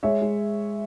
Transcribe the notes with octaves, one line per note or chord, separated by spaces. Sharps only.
G#3 C#5 E5
G#3